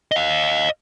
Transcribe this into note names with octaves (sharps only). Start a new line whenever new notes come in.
D#5 F5